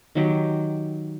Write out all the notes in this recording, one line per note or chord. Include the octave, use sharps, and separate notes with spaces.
D#3 F#3 G4